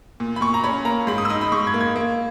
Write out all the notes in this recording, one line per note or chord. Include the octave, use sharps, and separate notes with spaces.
A#2
B5
A#2 C#6
A#5
C#4 B5
A#3 A#5
G#2 B5
D#6
E6
D#4 D#6
B5
G#2 C#6
G#6
A#3
G#6
A#3